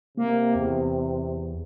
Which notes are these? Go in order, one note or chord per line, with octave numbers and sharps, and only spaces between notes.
C3 A#3
E2